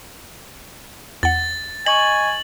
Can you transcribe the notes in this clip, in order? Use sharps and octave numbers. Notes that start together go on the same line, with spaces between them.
E2 F#5 A6
D#5 G#5 C#6 G#6 A6 F#7